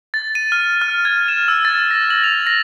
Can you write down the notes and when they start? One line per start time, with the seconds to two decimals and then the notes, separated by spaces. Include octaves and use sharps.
0.14 A6
0.35 D#7
0.52 F6
0.82 F6
1.05 G#6
1.28 E7
1.48 E6
1.65 A6
1.91 A#6
2.10 F#7
2.24 F7
2.47 A#6